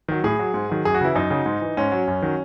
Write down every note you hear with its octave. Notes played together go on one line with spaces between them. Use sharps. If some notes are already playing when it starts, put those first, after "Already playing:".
D#3 F#3
A2 G#4
F#3
G#2
D#3 F#3
F#2 G#4
F#4
C#3 E3 E4
F#2 D#4
C#3 F#3
G#2
E3
G#2 C#4
F#3
F#2
D#3 F#3